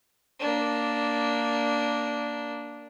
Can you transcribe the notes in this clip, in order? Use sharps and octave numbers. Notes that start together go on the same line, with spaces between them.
A#3 D4